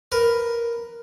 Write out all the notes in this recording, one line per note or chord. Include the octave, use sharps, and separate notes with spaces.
A#4 B4